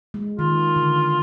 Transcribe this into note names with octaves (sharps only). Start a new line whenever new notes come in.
G#3
D#3 F4
D3